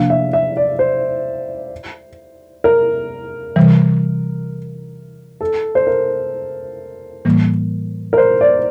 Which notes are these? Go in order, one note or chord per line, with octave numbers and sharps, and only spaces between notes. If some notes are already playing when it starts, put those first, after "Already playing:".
Already playing: C3 F3 A#3 D4 F5
E5
E5
D5
C5
A#4
C3 E3 G3
A4
C5
A#4
A2 E3 G3 A#3
A#4
C5
D5